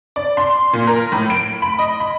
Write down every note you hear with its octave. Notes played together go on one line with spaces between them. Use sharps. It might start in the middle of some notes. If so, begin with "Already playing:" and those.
D5
C6
A#2
A#4
A2
D7
B5
D#5
B5